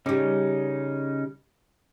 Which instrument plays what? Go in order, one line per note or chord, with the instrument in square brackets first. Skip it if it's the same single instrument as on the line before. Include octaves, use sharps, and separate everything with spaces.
[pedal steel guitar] C#3 C#4 D#4 [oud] G3 G4